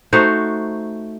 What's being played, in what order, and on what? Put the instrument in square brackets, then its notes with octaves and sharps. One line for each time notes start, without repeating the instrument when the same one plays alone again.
[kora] A3 D#4 F#4 C5